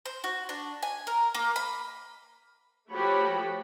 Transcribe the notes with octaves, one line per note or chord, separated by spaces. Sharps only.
C5
F#4
D4
G#5
A#4
A#3
B5
F3 A3 F#4 G4 C#5 B5